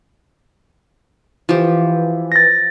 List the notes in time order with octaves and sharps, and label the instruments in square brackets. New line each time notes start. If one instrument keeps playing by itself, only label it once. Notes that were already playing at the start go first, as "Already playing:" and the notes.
[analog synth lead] E3 [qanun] F3 G4
[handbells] A6 A#6